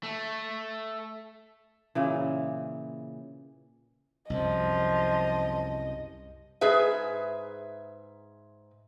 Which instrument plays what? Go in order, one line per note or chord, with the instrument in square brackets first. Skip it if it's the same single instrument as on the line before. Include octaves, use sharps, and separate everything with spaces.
[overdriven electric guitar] A3
[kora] A#2 C#3 E3
[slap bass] C2 F#2 [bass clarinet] F3 [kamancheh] D#5
[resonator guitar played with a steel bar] G#2 G#4 B4 E5